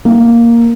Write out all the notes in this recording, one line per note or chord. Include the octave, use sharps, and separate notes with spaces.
A#3